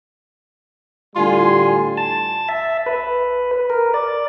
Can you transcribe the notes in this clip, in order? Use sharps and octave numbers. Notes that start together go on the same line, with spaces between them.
A2 D3 G3 F4 G#5 C6
A5
E5
B4
A#4
D5